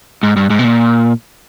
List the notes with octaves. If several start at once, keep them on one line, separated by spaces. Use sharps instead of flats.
G#2
G2
G#2
B2
A#2